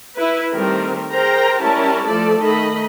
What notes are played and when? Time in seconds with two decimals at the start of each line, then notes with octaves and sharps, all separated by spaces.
0.16 E4 B4
0.52 D#3 G3 A3 C4 A#4
1.13 G#4 A#4 C5 G5 A#5
1.63 G3 C#4 E4 G4 A#4 A5
2.07 F3 A3 A4 D5
2.43 D#3 A3 D#5 B5